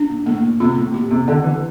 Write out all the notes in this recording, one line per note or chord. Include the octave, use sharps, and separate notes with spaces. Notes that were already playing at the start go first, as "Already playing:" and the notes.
Already playing: D4
A#2
A2 A#3
A#2
C3 F4
A2
A#2 G4
C3
D3 D5
E3